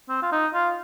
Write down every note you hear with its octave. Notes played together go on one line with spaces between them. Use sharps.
C4
F4
D#4
F4